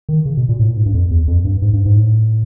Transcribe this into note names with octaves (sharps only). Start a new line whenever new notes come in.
D#3
C#3
B2
A#2
A2
A#2
G#2
G2
F2
E2
F2
G2
G#2
G2
G#2
A2